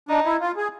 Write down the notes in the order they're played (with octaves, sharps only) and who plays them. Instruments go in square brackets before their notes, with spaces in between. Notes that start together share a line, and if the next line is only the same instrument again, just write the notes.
[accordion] D4 [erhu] D#4
[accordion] E4
F4
G#4